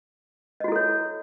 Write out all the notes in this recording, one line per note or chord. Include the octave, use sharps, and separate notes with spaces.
E4 F#4 A4 C#5 D#5